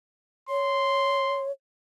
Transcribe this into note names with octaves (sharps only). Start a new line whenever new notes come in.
C#5 C6